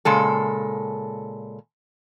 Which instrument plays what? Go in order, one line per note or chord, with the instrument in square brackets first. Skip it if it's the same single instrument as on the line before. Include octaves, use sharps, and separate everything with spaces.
[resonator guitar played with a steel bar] A#2 C#3 G#3 A4